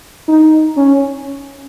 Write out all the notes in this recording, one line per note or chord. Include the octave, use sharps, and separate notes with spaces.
D#4
C#4